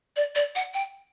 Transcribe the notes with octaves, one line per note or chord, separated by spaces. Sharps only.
D5
D5
F#5
G5